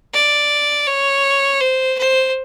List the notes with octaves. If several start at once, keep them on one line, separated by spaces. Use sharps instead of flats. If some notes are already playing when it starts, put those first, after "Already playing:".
D5
C#5
C5
C5